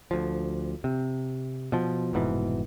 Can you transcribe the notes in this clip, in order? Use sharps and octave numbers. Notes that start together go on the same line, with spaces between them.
D2 F3
C3
B2 F3
F1 G#2 B2 E3